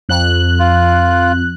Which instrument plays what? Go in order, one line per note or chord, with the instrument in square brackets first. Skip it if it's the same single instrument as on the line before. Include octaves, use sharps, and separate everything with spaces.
[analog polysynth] F2 F#6
[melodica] F4